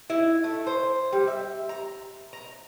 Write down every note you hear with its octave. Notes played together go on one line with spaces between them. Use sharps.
E4
A3
C5
G3
E5
A#5
A#5